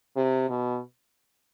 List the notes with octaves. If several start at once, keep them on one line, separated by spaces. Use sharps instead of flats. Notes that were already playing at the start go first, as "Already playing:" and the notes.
C3
B2